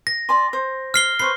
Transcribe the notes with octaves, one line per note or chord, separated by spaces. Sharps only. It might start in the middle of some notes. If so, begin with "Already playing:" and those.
A#6
D5 G#5 C6
C5
F6 C7 G7
B4 C5 C#6 C7